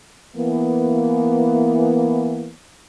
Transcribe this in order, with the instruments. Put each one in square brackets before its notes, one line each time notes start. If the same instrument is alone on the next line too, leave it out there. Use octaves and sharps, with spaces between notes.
[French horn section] E3 A#3 B3